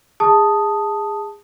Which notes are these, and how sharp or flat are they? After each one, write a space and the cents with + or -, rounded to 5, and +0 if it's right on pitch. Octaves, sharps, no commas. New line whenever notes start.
G#4 -20 A5 +0 D#6 +0